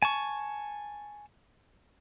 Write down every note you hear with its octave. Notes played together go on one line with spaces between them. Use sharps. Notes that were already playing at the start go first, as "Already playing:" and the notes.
G#5 A5 C#6